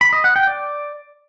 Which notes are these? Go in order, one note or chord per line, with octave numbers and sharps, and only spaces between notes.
B5
D#5
F#5
G5
D5